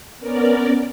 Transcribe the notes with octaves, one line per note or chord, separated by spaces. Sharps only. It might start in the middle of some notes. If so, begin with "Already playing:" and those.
B3 C#4 A#4 D5